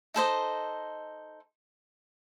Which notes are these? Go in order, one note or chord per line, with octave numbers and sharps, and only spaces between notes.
D#4 A4 C5 D#5